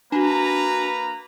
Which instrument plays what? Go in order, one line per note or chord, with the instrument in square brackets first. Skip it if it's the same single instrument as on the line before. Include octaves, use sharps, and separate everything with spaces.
[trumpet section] A#3 B4 A#5 [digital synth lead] D4 [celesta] F#4 G#5